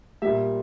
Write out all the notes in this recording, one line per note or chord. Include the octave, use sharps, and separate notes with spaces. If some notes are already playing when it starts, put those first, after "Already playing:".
A#2 G3 E5